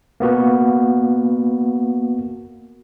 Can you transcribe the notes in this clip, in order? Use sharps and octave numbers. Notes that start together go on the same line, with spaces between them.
A#3 B3 F#4